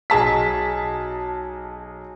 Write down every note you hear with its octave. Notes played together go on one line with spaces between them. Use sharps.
B1 G#4 A5 B6